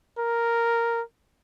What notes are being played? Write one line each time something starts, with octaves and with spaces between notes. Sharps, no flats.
A#4